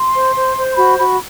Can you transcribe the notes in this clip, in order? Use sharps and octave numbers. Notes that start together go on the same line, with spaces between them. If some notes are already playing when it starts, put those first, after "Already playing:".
Already playing: C6
C5
C5
C5
C6
F#4 B5
F#4 B5